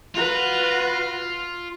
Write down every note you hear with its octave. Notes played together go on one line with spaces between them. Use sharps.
F4 F#4 B4